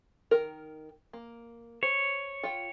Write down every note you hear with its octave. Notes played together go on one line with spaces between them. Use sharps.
D#3 A#4
A#3
C5 C#5
F4 G5